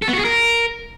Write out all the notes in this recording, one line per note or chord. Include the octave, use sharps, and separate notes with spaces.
A4
B3
F#4
G#4
A#4